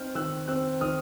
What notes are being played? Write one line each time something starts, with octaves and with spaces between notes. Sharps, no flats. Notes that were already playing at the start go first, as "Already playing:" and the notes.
Already playing: C4 D#4 F6 G6
D#3 E6 F#6
C4 E6 F#6
D#3 D#6 F6